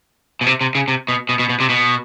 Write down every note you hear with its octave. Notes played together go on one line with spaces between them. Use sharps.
B2
C3
C3
C#3
C3
B2
B2
B2
B2
C3
B2